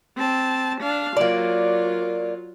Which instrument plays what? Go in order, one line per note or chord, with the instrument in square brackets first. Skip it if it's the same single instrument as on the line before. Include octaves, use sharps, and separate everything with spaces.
[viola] C4 A5
D4 F5
[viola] F#3 F4 [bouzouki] A#3 D5